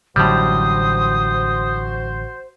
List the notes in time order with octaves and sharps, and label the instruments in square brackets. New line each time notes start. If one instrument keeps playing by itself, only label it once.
[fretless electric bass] A1 D3 F#3 [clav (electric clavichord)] A2 G3 [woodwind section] F#4 C5 [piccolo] D#6